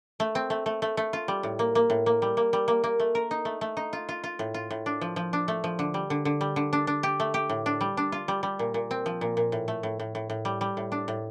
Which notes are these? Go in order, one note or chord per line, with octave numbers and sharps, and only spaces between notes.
A3
C4
A3
A3
A3
A3
F4
G3
A2
A#3
A#3
A2
A#3
G3
A#3
G3
A#3
A#3
A3
A#4
D#4
A3
A3
D#4
F4
F4
F4
A2
F4
A2
D4
F3
F3
D4
A3
F3
D3
G3
D3
D3
G3
D3
D4
D4
G4
A3
G4
A2
D4
G3
D4
F4
G3
G3
A#2
A#2
C4
F3
A#2
A#2
A2
A3
A2
A2
A2
A2
G3
G3
A2
D4
A2